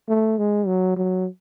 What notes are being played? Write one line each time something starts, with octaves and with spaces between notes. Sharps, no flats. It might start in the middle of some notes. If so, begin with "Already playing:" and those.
A3
G#3
F#3
F#3